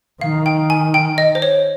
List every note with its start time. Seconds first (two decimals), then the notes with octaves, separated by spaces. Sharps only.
0.21 D#3 F5
0.46 G5
0.70 G#5
0.94 G5
1.18 D#5
1.35 C5
1.42 C#5